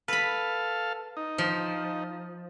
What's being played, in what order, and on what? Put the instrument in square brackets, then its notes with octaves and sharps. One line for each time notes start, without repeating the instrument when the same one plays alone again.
[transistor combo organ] A4 F5 [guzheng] B4 B5
[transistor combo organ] D#4
[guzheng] F3